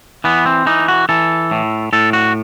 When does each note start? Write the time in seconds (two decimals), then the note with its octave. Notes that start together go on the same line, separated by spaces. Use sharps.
0.24 E3 B3
0.46 C4
0.66 E3 D#4
0.88 F#4
1.09 E3 A4
1.51 A2
1.93 A2 A4
2.13 F#4